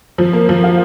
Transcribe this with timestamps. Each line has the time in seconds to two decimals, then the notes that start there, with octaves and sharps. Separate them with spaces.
0.18 F3
0.33 A#3
0.49 F3
0.64 F4